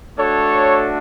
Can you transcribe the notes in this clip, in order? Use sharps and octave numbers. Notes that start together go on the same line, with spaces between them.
A3 D4 F#4 A4 C#5